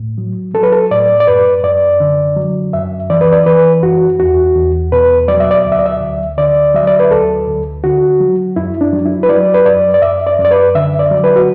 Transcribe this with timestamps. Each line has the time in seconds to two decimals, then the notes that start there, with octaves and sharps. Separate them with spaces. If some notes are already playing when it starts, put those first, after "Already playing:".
Already playing: A2
0.18 F#3
0.54 F#3 A4
0.63 B4
0.72 A4
0.91 A2 D5
1.20 D5
1.27 F#2 B4
1.64 F#2 D5
2.00 D3
2.36 F#3
2.73 F#2 E5
3.10 E3 D5
3.21 B4
3.32 D5
3.46 E3 B4
3.83 F#2 F#4
4.19 E2 F#4
4.55 E2
4.92 B2 B4
5.28 F#3 D5
5.40 E5
5.51 D5
5.65 D2
5.72 E5
5.79 D5
5.86 E5
6.01 D2
6.38 D3 D5
6.74 F#3 E5
6.87 D5
6.99 B4
7.11 D2 A4
7.47 D2
7.84 D3 F#4
8.20 F#3
8.56 F#2 E4
8.81 D4
8.93 F#3
9.05 E4
9.23 B4
9.29 F#3 D5
9.54 B4
9.65 F#2 D5
9.94 D5
10.02 F#2 E5
10.27 D5
10.39 F#2
10.45 D5
10.51 B4
10.75 D3 E5
10.99 D5
11.11 F#3
11.24 B4
11.36 F#4